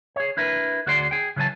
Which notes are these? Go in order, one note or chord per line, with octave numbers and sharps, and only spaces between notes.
G#4 C#5
D4 E4 A#4 B4
D2 F#4 G#4 D5 C6
G#4 G5
C#3 E3 F#3 G#5 A5